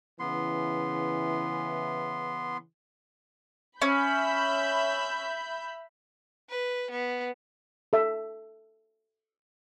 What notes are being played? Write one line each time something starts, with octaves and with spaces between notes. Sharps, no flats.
C#3 E3 B3 C6
C#4 E5 B5 G6
B4
B3
A4 E5